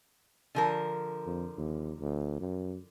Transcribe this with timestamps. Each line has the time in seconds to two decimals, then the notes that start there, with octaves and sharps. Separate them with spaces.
0.55 D3 F3 A#4
1.27 F2
1.57 D#2
2.00 D2
2.40 F#2